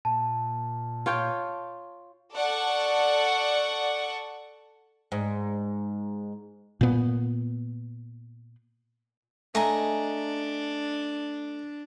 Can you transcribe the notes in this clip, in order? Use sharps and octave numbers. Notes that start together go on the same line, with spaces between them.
A#2 A5
F4 C#5 G5
A4 D5 F#5 C#6
G#2
A#2 B3
A3 D4 D#5 G#5 A#5